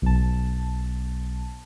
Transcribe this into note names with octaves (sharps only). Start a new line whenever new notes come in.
B1 A5